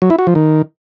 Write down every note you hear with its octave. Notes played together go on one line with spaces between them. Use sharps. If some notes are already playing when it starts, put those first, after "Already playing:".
F#3
E4
F#4
F3
D#3